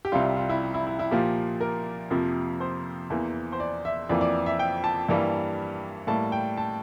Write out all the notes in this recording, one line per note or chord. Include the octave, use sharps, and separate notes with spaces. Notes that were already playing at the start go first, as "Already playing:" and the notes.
G4
C2 C3 G3 F4
F4
E4
E4
E4
E4
A#2 F3 A#3 G4
A#4
F2 C3 F3 A#3
C5
E2 E3 A#3
C5
D5
E5
F2 E3 A#3 D5
D5
E5
G5
A5
G2 E3 G3 A#3
A2 G3 A#3 A5
G5
A5